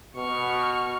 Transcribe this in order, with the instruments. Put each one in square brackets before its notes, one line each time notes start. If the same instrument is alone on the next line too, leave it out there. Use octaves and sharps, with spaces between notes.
[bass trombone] B2 [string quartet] C#6 F6